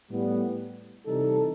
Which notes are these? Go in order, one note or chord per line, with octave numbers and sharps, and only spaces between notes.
A2 G3 B3
C3 E3 G3 D#4 A4